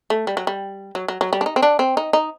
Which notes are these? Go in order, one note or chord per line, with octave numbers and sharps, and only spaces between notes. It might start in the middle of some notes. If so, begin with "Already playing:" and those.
A3
G3
F#3
G3
F#3
F#3
F#3
G3
D4
D#4
C4
D4
C4
D#4
D#4